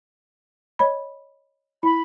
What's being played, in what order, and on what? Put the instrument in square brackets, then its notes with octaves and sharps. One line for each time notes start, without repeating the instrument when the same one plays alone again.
[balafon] C#5 D#5 B5
[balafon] E4 [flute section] B5